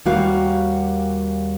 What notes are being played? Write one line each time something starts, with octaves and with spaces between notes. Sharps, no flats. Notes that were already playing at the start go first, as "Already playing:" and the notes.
D#2 G3 A#3 F#4 F5